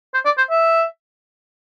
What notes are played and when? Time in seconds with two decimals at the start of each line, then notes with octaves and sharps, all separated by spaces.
0.14 C5
0.25 D5
0.38 C5
0.51 E5